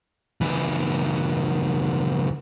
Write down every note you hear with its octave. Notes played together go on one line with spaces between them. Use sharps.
C#2 E3